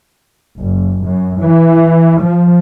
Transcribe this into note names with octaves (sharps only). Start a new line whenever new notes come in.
F#1
F#2
E3
F3